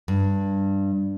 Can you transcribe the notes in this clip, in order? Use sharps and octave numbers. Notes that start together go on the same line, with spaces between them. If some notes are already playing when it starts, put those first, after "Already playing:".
G2